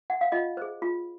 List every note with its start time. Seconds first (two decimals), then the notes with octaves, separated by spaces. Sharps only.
0.10 F#5
0.21 F5
0.32 F4 D#5
0.57 G#4 C5
0.82 F4